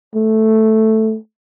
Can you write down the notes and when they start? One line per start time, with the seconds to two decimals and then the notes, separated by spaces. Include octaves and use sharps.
0.15 A3